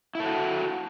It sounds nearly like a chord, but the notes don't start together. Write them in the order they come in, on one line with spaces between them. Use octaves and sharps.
E4 A4 F#4